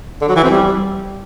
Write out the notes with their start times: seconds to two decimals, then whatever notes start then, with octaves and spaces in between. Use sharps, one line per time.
0.21 D3
0.29 F#3
0.36 E3
0.43 C4
0.51 G3